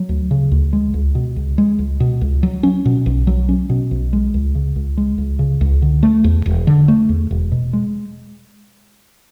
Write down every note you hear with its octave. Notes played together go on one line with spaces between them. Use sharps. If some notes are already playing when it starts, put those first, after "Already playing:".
Already playing: F#3
D2
C#3
D2
G#3
C#2
B2
C#2
G#3
C#2
B2
C#2
F#3
C#4
B2
B1
F#3
C#4
B2
B1
G#3
C#2
C#3
C#2
G#3
C#2
C#3
C#2
D3
A3
E2
E1
D3
A3
E2
E1
B2
G#3